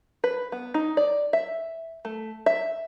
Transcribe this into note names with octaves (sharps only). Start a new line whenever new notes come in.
B4
B3
D#4
D5
E5
A3
E5